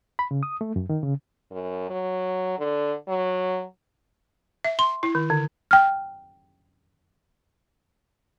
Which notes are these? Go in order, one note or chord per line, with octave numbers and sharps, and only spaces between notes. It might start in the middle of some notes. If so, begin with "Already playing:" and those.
B5
C#3
D#6
A3
F#2
D#3
C#3
F#2
F#3
D3
F#3
E5
C6
E4
D#3
D3
G5 F6